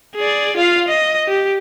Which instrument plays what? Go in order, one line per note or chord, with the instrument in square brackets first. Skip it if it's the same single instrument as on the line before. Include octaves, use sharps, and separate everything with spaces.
[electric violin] G#4 D5
F4 F5
D#5
G4